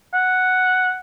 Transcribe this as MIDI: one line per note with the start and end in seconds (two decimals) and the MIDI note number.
0.14 1.00 78